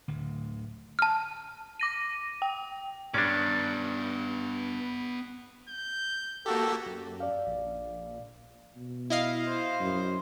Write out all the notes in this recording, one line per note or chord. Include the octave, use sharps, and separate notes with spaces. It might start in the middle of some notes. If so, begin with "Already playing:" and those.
D1 D2
A5 F6
D6 A#6 D#7
G5
G2 B3 C#4 D4 D5
G6
A#3 F#4 G4 A4
F#2
D5 F5
A#1
B2
E4 D#5 F5
C5
F#2